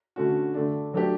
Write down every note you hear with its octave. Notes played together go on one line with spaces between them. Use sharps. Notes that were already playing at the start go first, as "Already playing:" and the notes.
D3 A3 C#4 F#4
D3 A3 D4
F#3 A3 D4 G4